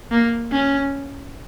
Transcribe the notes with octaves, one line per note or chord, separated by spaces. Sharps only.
A#3
C#4